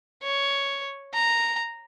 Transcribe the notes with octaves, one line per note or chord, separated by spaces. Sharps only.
C#5
A#5